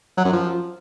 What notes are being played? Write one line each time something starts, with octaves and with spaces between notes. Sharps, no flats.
F#3
F#2
F3